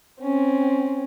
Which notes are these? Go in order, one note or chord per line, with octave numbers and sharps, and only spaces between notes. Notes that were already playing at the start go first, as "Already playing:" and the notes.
C4 C#4